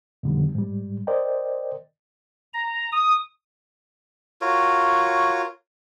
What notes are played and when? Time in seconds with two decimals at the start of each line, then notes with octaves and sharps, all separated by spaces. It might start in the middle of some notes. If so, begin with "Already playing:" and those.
0.23 F2 B2 D3 D#3 G3
0.55 G#2 G3
1.07 A#4 C5 D5 D#5 G5
2.53 A#5
2.92 D#6
4.41 F4 F#4 A#4 C#5